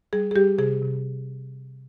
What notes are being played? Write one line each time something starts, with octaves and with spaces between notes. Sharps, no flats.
G3 G#4
G#4
G3 G4
C3 G#4
C3